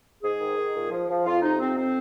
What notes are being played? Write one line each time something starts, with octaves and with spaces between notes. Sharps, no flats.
G#2 G#4
D#3
D#3
A#2
F3
F3
F2 F4
C3 D#4
F2 C4
C4